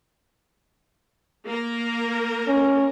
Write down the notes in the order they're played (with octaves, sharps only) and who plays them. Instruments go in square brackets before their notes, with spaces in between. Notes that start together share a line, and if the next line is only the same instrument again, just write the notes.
[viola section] A#3 A#4
[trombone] C#4